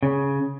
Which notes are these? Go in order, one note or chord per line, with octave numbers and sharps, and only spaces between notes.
C#3